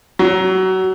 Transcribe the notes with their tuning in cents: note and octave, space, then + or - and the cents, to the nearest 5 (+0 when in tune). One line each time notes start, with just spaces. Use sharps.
F#3 +25